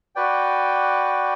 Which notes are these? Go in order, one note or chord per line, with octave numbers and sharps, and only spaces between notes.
F#4 B4 D5 G5